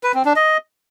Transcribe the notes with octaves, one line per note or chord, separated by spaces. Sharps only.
B4
C4
D4
D#5